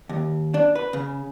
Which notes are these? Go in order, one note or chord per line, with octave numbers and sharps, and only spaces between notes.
D#2
D4
B4
C#3